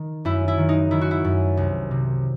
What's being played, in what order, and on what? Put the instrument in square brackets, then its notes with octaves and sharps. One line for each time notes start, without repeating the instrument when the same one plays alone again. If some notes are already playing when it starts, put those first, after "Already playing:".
Already playing: [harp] D#3
F#2 E4
E4
D#3
D#4
D#3 E4
F#4
E4
F#2
C2
C3